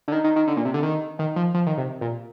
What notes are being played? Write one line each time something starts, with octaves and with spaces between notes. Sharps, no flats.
D3
D#3
D#3
D#3
D3
A#2
C3
D3
D#3
D#3
F3
F3
D#3
C3
A#2